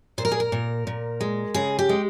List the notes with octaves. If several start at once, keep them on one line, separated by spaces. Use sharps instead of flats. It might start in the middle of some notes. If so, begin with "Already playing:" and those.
A#2 C5
A#4
G#4
A#4
A#2
A#2
G#3
C#3 G#4
G4
G#3